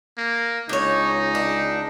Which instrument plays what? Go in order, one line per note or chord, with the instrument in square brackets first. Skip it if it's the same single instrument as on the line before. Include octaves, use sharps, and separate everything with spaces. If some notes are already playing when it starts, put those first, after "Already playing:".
[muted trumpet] A#3
[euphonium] C#2 [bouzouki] D4 C#5 [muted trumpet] D#4
[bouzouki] D4